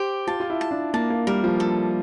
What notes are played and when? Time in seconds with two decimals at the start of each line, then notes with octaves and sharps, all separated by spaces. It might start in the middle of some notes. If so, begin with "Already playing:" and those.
Already playing: G4 C5
0.27 F4 A5
0.40 F4
0.50 E4
0.61 A5
0.71 D4
0.94 A#3 A5
1.10 A#3
1.27 G3 A#4
1.44 F3
1.60 A4